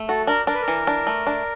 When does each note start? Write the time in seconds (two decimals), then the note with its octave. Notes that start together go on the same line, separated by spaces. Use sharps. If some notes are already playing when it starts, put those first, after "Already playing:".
Already playing: A3
0.08 F#4 A4
0.27 D4 A#4
0.47 D4 A#4
0.54 B4
0.62 A#4
0.68 E3
0.87 D4
1.07 A3
1.27 D4